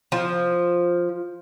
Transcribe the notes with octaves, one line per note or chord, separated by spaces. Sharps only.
F3